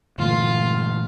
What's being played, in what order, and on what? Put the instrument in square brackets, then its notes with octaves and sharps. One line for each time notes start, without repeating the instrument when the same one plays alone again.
[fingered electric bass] G2 D3 G#3 [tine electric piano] A#2 E3 A3 [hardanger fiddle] F4